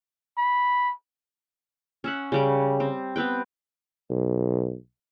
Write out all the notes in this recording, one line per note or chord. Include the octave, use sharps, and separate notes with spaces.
B5
C#4 E5 F#5
C#3 G3 D6
C4
B3 C4 B4 G5
B1